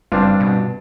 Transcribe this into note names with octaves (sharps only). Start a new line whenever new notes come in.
F#1 G2 C4 D4 F4
B2